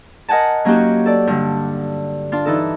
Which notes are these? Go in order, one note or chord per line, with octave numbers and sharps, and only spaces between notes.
A#4 D#5 F#5 G#5 A5
F#3 A#3 C#4 D#4 F#4 G4
A4 D5
G2 D3
D4 F4
E3 D#4 A4